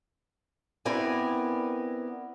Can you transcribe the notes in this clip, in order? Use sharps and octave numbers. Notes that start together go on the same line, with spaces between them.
B3 C4 E4 A#4 D5 G#5